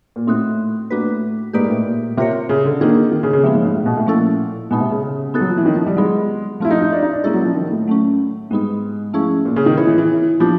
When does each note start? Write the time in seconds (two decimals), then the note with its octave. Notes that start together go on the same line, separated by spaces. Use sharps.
0.16 A#2
0.27 A2 C4 D#4 F#4
0.90 A2 A#3 D4 F#4 B4
1.53 G#2 A#3 D#4 G4 B4 D5
1.65 A#2
1.70 A2
1.85 A#2
2.17 C3 C4 F4 A#4 C#5
2.49 C#3
2.65 D3
2.81 D#3 A#3 D4 F4 G#4
3.12 D#3
3.23 C#3
3.33 C#3
3.43 C3 F3 G#3 B3
3.54 G#2
3.64 G#2
3.75 A2
3.86 B2
3.97 A2
4.07 A#2 F3 A3 C#4 E4 A4
4.71 B2 G#3 B3 D#4
4.80 C3
4.91 C#3
5.03 C#3
5.34 B3 D#4 F#4 A4
5.41 F#3
5.50 F3
5.57 E3
5.66 D#3
5.76 F3
5.86 G3
5.97 F#3 G#3 B3 D#4
6.60 F3 A3 C4 E4 F4
6.70 D#4
6.82 D#4
6.92 D4
7.03 D#4
7.13 D4
7.24 G#3 A#3 C#4 E4 A4
7.34 F#3
7.45 F3
7.55 D#3
7.71 A2
7.87 F#3 A3 C#4
8.51 G#2 G3 B3 D#4
9.13 F3 A3 C#4 E4 G#4
9.45 A#2
9.56 C#3
9.66 D#3
9.77 E3 B3 D#4 G#4 C#5
9.87 E3
9.98 E3
10.40 F3 B3 D4 G4